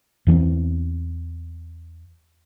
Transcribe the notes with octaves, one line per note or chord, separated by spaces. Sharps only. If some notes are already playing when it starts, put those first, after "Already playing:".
E2 E3 B3 C4